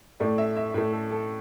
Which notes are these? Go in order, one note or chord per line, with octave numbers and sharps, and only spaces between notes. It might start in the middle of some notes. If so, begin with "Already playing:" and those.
A2 A3 D5
E5
E5
A2 A3
A4
A4